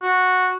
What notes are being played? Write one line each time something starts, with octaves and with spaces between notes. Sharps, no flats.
F#4